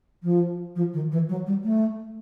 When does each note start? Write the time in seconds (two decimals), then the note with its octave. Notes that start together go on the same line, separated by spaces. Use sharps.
0.23 F3
0.75 F3
0.93 D#3
1.11 E3
1.29 F#3
1.46 G3
1.64 A3